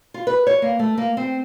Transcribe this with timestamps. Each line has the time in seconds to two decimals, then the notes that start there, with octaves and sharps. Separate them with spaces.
0.14 F4
0.27 B4
0.47 C#5
0.62 A#3
0.79 A3
0.98 A#3
1.17 C4